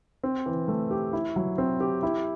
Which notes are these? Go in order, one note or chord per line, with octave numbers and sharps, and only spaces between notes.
C4
E3
A3
G4
E4
F#3
C4
G4
E4